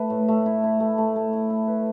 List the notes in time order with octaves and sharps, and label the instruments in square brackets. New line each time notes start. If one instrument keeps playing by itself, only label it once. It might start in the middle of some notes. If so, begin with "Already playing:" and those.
Already playing: [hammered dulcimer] A3 B4
A2
A3
E4
E4
A3
A3
A3
E4
E4
B4